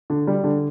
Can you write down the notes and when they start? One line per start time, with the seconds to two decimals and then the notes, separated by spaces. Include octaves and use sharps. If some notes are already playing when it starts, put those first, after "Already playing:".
0.10 D3
0.27 G3
0.44 D3